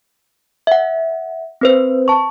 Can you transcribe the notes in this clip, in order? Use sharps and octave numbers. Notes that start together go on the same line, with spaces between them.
E5 F#5
C4 B4 C5
A5 C#6